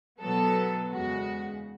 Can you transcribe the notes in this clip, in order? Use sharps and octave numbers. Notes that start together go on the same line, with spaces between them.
B2 F#3 B3 A4
E2 C#3 G#3 F#4